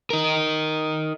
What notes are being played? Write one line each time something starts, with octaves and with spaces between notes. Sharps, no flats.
D#4 A#4